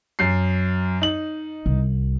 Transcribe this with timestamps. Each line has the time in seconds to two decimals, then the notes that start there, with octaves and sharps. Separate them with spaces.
0.19 F#2 C7
1.02 D#4 F#7
1.66 C2